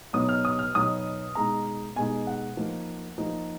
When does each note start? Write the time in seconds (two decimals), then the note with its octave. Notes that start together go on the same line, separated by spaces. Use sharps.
0.13 B2 F#3 B3 D#4 D#6
0.29 F6
0.45 D#6
0.59 F6
0.74 B2 F#3 B3 D#4 D#6
1.35 B2 G#3 D#4 A#5
1.96 B2 G#3 D#4 G#5
2.27 F#5
2.57 F3 A#3 D#4
3.18 F3 A#3 D#4